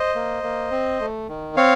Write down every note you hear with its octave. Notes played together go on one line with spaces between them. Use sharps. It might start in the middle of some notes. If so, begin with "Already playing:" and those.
Already playing: C5 D#5
A#3
A#3
C4
A3
D#3
C4 C#5 F5